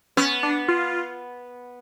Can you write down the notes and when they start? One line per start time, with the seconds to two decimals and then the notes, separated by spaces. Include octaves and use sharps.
0.17 B3 C#4
0.43 D4
0.68 F4